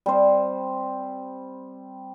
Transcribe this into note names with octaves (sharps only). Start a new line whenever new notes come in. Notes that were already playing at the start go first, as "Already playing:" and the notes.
G3 C4 C5